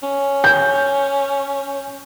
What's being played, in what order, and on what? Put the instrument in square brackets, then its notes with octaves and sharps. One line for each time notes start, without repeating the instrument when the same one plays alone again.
[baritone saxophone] C#4
[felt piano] G6